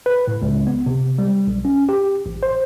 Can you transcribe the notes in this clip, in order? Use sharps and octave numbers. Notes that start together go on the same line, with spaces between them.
B4
A2
C#2
B3
C3
G3
B1
C#4
G4
A1
C5